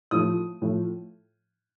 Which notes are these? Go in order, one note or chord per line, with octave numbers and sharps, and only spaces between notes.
A2 F3 D#6
A2 F3